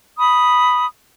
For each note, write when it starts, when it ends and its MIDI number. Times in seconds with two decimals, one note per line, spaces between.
0.18 0.85 83
0.18 0.85 87